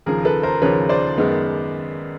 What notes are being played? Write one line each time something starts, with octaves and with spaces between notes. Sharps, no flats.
D#2 C#3 F3 G#4 A#4
A4 B4
A#4 C5
D#2 C#3 F3 B4 C#5
C5 D5
F#2 D#3 G#3 B3